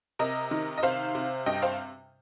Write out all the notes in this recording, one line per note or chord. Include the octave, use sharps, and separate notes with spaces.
C3 A#4 D#5
D#3
D#5
C3 C5 F5
C3
G2 D#5 G5
C5 F5